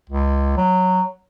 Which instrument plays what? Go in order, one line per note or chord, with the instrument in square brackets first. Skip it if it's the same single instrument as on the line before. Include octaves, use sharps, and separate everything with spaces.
[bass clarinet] C#2
F#3